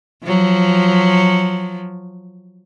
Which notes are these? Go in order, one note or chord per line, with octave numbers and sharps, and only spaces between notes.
F3 F#3